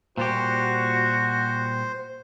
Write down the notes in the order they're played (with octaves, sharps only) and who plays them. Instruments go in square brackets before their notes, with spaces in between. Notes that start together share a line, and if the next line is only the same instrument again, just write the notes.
[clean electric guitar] A#2 G3 G4 [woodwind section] F#4 [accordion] C5